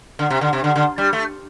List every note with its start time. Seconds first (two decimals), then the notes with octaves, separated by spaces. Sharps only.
0.19 D3
0.30 C3
0.41 D3
0.53 C3
0.64 D3
0.76 D3
0.98 G3
1.13 A3